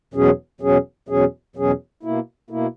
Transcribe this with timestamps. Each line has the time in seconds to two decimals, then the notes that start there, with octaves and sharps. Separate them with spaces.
0.14 E2 B2 F#3 C#4 G#4
0.61 E2 B2 F#3 C#4 G#4
1.08 E2 B2 F#3 C#4 G#4
1.56 E2 B2 F#3 C#4 G#4
2.03 B2 A#3 E4
2.50 B2 A#3 E4